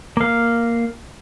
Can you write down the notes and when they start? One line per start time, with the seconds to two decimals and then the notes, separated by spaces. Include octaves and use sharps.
0.17 A#3 F5